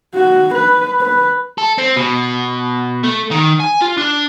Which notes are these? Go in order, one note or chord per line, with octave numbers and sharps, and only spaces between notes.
F#4
B4
B4
A4
C4
B2
A3
D#3
G#5
F4
D4